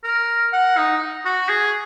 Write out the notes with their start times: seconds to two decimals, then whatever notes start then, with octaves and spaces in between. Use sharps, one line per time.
0.04 A#4
0.53 F#5
0.77 D#4
1.25 F#4
1.49 G#4